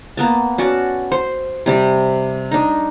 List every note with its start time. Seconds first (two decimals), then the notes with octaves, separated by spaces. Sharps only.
0.17 A#3 B3 A5
0.58 C#4 F#4 D5 A5
1.12 C5
1.66 C3 G3 G4
2.51 D4 D#4